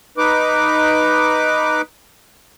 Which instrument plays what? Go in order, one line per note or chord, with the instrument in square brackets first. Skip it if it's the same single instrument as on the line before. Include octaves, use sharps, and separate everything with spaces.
[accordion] D#4 B4 D6